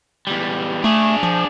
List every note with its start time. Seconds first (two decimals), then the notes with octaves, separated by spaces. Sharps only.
0.27 E2 G3
0.84 A3 D4 G#4
1.23 F3